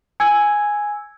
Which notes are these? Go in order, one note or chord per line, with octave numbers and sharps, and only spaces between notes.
G#5 E6 G#6